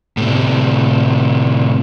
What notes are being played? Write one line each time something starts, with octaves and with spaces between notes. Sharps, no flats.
A2 C3